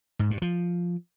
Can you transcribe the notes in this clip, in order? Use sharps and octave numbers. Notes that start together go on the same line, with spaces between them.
G#2
G2
F3